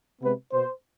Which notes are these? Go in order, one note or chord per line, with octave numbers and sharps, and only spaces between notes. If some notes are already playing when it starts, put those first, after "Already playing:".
C3 G#3 B3 B4
B2 B3 C5